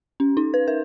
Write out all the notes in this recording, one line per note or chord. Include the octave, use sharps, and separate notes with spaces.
C#4
D#4
B4
A#4